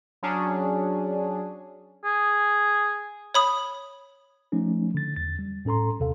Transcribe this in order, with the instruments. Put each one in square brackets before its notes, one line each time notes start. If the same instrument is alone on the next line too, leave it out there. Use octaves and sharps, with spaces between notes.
[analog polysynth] F#3 C#4 D4 G#4
[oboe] G#4
[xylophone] C#5 B5 D#6
[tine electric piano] F3 A3 C#4 D#4
D3 A6
E2 A6
G3
A2 C#4 A4 A#5 C6
D#2 C3 A4 F5